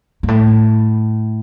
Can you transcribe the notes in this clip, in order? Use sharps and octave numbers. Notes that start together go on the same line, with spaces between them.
G#2
A2